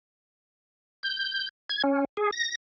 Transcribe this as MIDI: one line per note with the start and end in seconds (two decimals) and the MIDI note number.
1.03 1.49 91
1.70 1.82 92
1.84 2.05 61
2.17 2.31 68
2.33 2.55 94